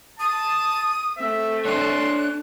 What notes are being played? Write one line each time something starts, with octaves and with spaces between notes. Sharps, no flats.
A5 D#6
A3 C4 E5
D4 C#5 C6 F#6